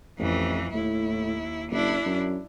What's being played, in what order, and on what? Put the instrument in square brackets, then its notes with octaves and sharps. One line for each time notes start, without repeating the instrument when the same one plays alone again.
[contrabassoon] A1 [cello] F2 E3
[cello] D#2 E4 [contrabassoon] A2
[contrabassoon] F#1 [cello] D4 E4
[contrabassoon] F#2